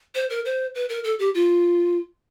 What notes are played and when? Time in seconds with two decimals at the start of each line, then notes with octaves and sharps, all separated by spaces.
0.15 C5
0.30 A#4
0.45 C5
0.75 B4
0.89 A#4
1.04 A4
1.19 G4
1.35 F4